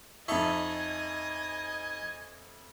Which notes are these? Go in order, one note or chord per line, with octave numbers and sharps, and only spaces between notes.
F2 D#4 A4 D#5 E5 G#5 C#6